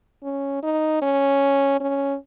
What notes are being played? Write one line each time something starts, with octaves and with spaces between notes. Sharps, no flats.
C#4
D#4
C#4
C#4